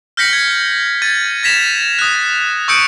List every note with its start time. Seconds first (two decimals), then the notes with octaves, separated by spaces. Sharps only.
0.17 F6 G6 A#6 B6 C#7 F#7
0.33 G#6
1.02 G#6 A6 D#7
1.43 G#6 A#6 B6 E7 F7
1.99 D#6 F#6
2.68 C#6 D#6 E6 G6 C#7 D7